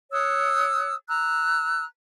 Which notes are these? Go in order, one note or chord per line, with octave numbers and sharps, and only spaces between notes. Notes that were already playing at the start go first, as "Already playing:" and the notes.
C#5 D#6 E6 F#6
A#5 E6 F#6